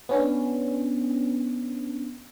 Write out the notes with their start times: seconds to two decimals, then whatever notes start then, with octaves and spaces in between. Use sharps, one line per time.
0.09 B3 C#4 D4